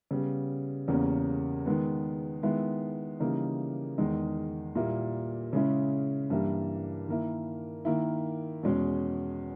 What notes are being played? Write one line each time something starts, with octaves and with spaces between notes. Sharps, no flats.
C#3 G3 B3
E2 C#3 G3 A#3 C#4
D#3 G#3 B3
D#3 G#3 B3 E4
C#3 E3 G3 A#3 D#4
E2 D#3 G#3 D#4
A#2 G3 A#3 E4
C#3 G#3 C#4 E4
G2 E3 G3 A#3 E4
D#3 A#3 E4
D#3 A#3 E4
E2 B2 G#3 C#4